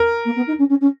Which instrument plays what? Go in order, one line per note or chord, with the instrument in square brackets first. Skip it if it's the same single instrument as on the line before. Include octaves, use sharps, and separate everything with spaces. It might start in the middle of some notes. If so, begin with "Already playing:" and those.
Already playing: [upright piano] A#4
[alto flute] A#3
B3
D#4
C#4
C#4
C#4